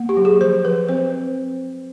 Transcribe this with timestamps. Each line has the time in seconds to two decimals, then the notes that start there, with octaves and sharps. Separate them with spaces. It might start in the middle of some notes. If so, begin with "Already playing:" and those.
Already playing: A#3
0.09 G4
0.17 F#3
0.25 G#4
0.41 F3 C5
0.65 F3 B4
0.89 C4 C5